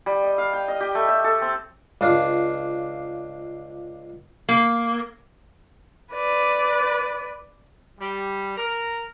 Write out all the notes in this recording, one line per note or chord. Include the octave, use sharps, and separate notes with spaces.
G3
D#5
F5
G5
D#5
G4
A3
E5
A4
C4
C#2 D4 F4
A#3
B4 D5
G3
A#4